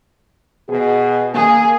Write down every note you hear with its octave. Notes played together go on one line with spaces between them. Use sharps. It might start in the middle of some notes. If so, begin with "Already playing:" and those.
B2 G#4 D#5
A#3 G#4